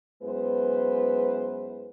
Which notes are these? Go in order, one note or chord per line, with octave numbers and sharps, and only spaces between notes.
F#2 G#3 B3 E4 B4 C5